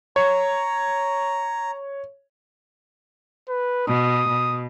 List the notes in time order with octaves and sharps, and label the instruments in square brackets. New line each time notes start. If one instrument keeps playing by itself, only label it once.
[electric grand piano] C#5 [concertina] A#5
[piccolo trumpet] B4
[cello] B2 [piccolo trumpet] D#6
[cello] B2